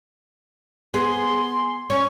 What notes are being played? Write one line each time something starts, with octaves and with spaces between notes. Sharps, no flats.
B3 G#4 C6
C#4 C#6